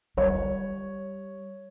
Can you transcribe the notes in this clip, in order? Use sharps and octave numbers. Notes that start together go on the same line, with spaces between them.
G3 C#5